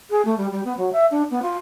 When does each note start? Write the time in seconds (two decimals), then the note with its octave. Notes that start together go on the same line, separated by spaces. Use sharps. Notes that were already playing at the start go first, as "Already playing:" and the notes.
0.10 G#4
0.25 A3
0.37 G3
0.51 G3
0.64 B3
0.77 F#3
0.92 E5
1.10 D4
1.30 B3
1.42 F4